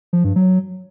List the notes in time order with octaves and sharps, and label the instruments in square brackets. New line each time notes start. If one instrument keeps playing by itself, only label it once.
[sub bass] F3
G2
F#3